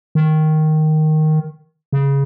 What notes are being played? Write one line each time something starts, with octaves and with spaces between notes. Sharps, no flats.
D#3
C#3